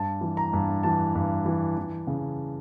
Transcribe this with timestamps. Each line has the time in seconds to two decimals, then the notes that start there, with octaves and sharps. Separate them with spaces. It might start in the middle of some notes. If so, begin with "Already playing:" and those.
Already playing: G2 A5
0.21 E3
0.37 A#5
0.53 G2
0.83 E3 A5
1.15 G2
1.46 E3
1.77 E3
2.07 C#3